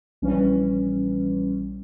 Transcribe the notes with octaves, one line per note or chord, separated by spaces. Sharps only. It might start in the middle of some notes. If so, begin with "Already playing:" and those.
A#1 E3 G3 C#4